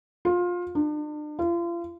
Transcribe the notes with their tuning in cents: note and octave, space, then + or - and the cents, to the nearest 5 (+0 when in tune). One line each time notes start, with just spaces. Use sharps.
F4 +20
D4 +40
F4 -35